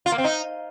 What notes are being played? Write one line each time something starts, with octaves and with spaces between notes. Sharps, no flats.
F4
A#3
C4
D#4